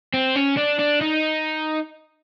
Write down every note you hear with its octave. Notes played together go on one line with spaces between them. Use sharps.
C4
C#4
D4
D4
D#4